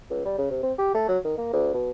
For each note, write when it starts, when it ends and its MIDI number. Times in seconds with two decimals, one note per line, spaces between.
0.10 0.22 37
0.25 0.37 55
0.38 0.47 49
0.50 0.61 48
0.63 0.73 60
0.78 0.91 67
0.94 1.08 57
1.08 1.18 54
1.25 1.34 51
1.38 1.49 58
1.53 1.72 38
1.74 1.91 47